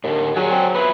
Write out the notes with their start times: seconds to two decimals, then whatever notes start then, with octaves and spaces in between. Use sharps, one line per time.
0.04 D#2 A2 D3
0.36 F#3 G#4 C#5 D5 G#5
0.51 C4
0.75 B3 E4 F4 B4